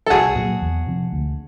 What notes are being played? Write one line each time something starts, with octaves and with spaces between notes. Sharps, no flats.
A4
C2 F#4 G#4
A#2 F#3
E2
C3 F3
D2